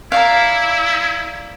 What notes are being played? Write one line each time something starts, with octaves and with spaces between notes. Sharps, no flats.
E4 A#4 D5 F5